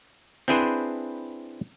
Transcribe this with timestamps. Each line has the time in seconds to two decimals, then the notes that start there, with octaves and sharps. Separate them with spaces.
0.48 C4 D4 E4 G#4 B4 C5